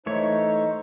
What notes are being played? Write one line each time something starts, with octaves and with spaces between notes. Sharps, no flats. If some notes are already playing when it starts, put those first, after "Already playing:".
E3 A3 D#4 C5 C#5